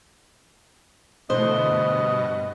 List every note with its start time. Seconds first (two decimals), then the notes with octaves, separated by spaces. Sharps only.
1.30 B2 D3 E3 A3 C5 D#5
1.66 G2 G3